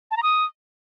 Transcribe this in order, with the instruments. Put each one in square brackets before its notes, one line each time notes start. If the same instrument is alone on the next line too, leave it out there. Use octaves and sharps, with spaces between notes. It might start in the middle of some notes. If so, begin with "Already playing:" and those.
[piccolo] A5
A#5
D#6